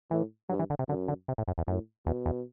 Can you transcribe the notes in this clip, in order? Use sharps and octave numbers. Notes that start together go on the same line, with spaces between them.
A2 E3
G2 F#3
E3
D3
C3
F#2 D3
D3
C3
A2
F#2
E2
F#2 A2
E2 B2
E2